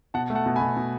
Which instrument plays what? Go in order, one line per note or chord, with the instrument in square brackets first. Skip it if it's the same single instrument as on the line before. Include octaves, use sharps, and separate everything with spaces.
[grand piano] B2 F#5 A5
A3
F#5 A5
B2
G#5 B5
B2
B2